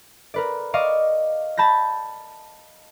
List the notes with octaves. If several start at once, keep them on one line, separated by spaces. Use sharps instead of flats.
A#4 B4 D5
D5 D#5 F5 C#6 D6
A5 B5 G6 A#6